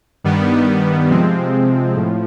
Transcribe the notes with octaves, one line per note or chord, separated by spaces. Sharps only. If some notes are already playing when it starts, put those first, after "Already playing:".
G2 D#3 G3 B3
C3 F3 G#3 C4
A2 F3